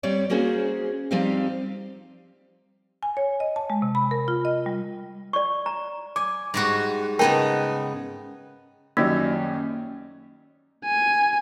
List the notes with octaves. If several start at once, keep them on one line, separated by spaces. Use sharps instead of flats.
G3 C4 C#5 D5
A#3 C#4 F#4 G#4 C5
F3 G3 C4 D#4 G4 F5
G#5
C#5
D#5
A5
G#3
C3
B5
A#4
F4
D#5
G3
D5 C#6
A#5
G#5 D6
G#2 G3 F#4
C#3 B3 D#4 A#4 G5 A5
F#2 D#3 G3 A#3 C#4
G#5